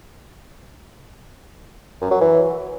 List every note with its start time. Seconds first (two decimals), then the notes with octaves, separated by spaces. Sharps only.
2.01 F#2
2.11 F#3
2.21 E3